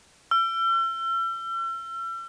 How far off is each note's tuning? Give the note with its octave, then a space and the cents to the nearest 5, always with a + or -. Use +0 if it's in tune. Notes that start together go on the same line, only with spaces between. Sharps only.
E6 +40